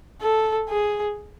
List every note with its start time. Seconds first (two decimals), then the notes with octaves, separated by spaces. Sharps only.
0.21 A4
0.69 G#4